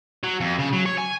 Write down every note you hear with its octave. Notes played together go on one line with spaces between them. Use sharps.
F#3
F2
C#3
F#3
C#5
G#5